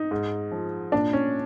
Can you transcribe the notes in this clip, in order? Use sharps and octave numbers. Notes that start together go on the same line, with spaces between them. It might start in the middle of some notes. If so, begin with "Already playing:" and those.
Already playing: D#4
G#2
F3
A#2 D4
C#4